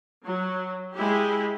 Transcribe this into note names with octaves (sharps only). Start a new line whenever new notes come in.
F#3
G#3 E4 G4